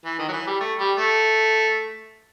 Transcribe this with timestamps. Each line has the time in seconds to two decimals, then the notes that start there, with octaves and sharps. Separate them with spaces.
0.05 E3
0.19 D#3
0.28 F#3
0.33 E3
0.47 G3
0.60 A3
0.79 G3
0.97 A3